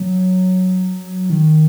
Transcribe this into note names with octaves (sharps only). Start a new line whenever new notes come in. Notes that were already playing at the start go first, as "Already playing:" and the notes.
Already playing: F#3
D#3